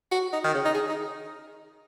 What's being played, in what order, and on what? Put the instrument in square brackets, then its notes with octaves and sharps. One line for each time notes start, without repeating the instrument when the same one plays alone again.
[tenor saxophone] F#4
D#4
D#3
C#3
D#4
G#4
D#4